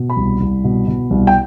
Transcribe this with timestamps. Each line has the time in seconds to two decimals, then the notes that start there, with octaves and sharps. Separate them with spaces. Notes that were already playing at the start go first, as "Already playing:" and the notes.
Already playing: B2
0.10 B5
0.17 C2
0.40 C2
0.64 B2
0.87 B2
1.10 C2
1.27 G5